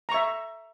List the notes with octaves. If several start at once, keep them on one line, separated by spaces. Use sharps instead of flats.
E5 A#5 C#6